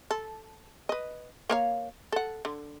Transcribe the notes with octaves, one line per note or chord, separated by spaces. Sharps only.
A4
B4 D#5
A#3 C#5 F5
A4 F#5
D3